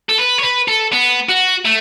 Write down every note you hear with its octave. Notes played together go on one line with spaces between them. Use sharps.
A4
B4
C#5
B4
A4
B3
F#4
A3